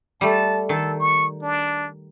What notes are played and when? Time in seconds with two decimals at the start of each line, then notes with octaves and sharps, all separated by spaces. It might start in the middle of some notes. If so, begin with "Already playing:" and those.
0.21 G3 A3 A5
0.69 D#3 A4
1.00 C#6
1.42 D4